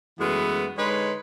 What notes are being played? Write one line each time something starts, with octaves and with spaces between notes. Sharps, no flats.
F#2 E3 G#3 A3 B3 B4
D3 G#3 D#4 B4 C#5 C6